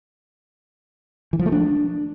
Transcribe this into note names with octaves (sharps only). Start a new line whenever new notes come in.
E3
F3
A3
D4